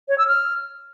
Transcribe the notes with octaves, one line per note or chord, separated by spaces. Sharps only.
C#5
E6
F6